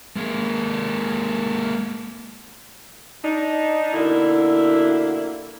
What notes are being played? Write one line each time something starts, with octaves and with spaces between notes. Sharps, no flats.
G#3 A#3
D4 D#4
B2 D3 A#3 E4